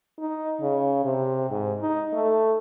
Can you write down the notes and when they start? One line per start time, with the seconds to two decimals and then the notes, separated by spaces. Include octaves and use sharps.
0.19 D#4
0.61 C#3
1.04 C3
1.50 G#2
1.81 D#4
2.13 A3